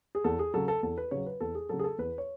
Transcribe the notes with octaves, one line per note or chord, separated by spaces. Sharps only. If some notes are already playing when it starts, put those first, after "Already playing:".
G#4
E2 A4
G#4
C#3 F#3 A4
A4
E2 A4
B4
C#3 F#3 C#5
B4
E2 A4
G#4
C#3 F#3 A4
G#4
A4
E2 B4
C#5